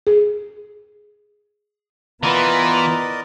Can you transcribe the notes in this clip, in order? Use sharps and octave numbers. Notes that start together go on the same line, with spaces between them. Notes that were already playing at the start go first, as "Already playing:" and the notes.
G#4
E3 B3 F4 A#4 D5 D#5 A#5 B5